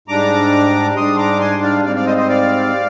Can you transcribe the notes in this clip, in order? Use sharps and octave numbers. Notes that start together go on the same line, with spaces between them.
G#2 G3 D4 A#5 D6
G#2 G3 D4 C6 D#6
A#5 D6
G#5 C6
D5 F5
G#2 G3 C4 D5 F5
D5 F5
C5 D#5
C5 D#5
D5 F5